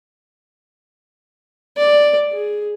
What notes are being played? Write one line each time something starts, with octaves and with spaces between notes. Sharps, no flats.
D5
G#4